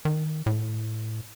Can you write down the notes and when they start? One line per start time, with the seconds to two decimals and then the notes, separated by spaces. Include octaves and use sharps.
0.05 D#3
0.46 A2